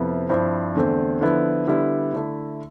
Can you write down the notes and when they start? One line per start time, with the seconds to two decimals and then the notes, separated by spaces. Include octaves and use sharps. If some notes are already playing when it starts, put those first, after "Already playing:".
Already playing: F2 C3 F3 B3 E4
0.29 G2 F3 C4 E4
0.75 E2 D3 A3 C4
1.21 D3 F3 B3 E4
1.68 D3 G3 B3 E4
2.14 D3 A3 E4